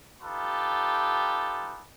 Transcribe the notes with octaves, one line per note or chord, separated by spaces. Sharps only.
D#4 F4 G4 A4 B4